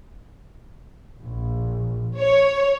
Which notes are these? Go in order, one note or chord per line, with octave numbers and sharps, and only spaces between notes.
A#1
C#5